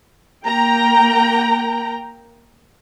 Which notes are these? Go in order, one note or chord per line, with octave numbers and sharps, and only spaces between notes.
A#3 G5 A#5